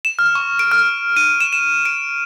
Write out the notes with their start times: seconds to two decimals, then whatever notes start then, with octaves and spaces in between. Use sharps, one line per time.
0.05 E7
0.19 F6
0.35 C#6
0.59 D7
0.72 F6
1.17 D#7
1.41 E7
1.53 E7
1.85 D7